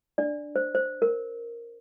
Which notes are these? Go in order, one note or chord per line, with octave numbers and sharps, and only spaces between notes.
D4 D5
C5
C5
A#4